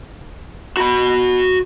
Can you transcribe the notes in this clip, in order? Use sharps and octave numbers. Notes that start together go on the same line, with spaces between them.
F#4 B5